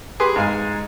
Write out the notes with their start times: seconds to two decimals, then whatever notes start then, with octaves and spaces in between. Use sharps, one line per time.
0.20 G4 G#4 B4 C6
0.36 G#2 F5 G#5